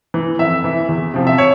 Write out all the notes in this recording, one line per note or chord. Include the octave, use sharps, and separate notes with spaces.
E3
F2 E5
E3
E2
C3 F3
E5
C#5